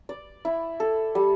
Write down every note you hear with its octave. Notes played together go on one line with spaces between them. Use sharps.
D5
E4
A4
G3